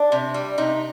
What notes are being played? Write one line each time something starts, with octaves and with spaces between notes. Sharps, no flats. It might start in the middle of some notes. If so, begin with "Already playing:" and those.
Already playing: D4
C3
G3
C3 D#4